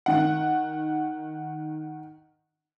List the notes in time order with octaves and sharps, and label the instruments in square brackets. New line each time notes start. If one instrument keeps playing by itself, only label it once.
[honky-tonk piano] D#3 F#5